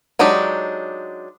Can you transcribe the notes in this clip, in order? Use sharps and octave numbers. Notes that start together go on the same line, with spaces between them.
F#3 G#3 D4 D#4 G4